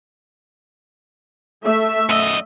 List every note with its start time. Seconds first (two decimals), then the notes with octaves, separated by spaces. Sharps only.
1.63 A3 E5
2.09 F#2 D#5